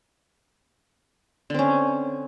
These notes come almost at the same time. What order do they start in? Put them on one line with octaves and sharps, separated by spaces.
D3 C4 C#4